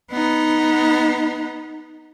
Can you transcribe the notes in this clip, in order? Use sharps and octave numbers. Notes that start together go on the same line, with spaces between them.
B3 D#4